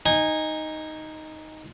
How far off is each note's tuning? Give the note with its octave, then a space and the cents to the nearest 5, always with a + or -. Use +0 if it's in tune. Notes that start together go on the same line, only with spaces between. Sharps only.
D#4 +0 G#5 -20